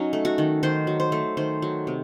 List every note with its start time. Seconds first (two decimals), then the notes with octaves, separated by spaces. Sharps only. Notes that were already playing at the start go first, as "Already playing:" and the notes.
Already playing: F#3 C#4 D#4
0.13 A3
0.25 F#4
0.38 D#3
0.63 D#3 C5
0.87 F#3
1.00 C5
1.12 A3
1.37 D#3 C5
1.62 F#3
1.87 C3